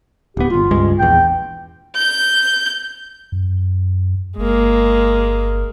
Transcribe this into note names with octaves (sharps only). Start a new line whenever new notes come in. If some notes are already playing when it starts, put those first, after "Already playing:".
D1 B3 G4
D1 G1 F4
C#2 G2 G#3
A#1 E2 G5
G6
F#2
G1 G#3 A#3